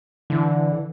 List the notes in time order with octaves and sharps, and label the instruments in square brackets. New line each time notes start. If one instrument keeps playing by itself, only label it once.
[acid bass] D3 [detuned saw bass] E3